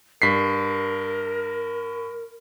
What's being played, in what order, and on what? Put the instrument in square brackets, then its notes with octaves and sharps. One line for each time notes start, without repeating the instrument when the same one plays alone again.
[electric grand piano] G2 B6 C7 [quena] A#4